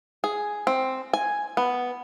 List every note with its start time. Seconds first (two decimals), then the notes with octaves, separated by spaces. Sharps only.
0.24 G#4
0.67 C4
1.13 G#5
1.57 B3